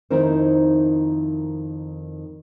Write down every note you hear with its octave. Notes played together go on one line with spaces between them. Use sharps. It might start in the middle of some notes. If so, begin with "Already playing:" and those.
F2 D#3 D#4 E4 A#4 C5